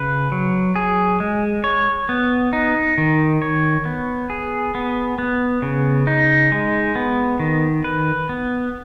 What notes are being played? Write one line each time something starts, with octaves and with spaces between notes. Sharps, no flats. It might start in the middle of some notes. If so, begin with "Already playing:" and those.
Already playing: C#3 B4
F#3
G#4
G#3
C#5
B3
D#4
D#3
C#5
B3
G#4
B3
B3
C#3
D#4
G#3
B3
D#3
B4
B3